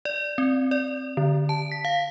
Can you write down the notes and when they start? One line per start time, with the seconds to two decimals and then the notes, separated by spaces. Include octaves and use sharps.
0.05 D5
0.38 C4
0.71 D5
1.17 D3
1.49 A5
1.72 B6
1.85 F5